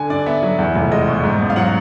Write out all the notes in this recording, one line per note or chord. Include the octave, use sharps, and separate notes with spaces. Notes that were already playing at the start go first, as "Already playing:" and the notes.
Already playing: D3 G#5
G2 D5
B3 E5
F#3
E2
F1
G#3 D#5
B2
G#2
A1
F5
F#3 F#5